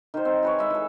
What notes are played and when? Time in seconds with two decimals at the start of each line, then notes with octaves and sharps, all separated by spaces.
0.14 D#3 C5
0.25 C4
0.43 G#4 B4 C#5
0.59 G#3 E5
0.70 E3 A4